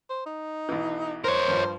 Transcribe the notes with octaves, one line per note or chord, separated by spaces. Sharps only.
C5
D#4
B1 E3
A#4 C5 C#5
G2 F3